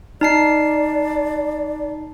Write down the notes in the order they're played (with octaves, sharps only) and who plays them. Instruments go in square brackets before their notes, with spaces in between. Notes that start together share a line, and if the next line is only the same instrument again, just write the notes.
[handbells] D#4 A5 C7 [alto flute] D5